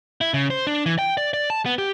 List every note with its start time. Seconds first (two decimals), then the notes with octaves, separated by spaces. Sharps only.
0.21 E4
0.34 C#3
0.50 C5
0.67 D4
0.86 E3
0.99 G5
1.17 D5
1.34 D5
1.50 A5
1.66 B3
1.78 G4